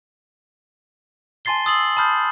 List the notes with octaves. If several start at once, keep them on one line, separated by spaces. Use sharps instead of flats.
G#5 A5 C6 A6 C7 G7
D#6 E6 A6 C7 F#7
A5 B5 D#6 F6 G6 C7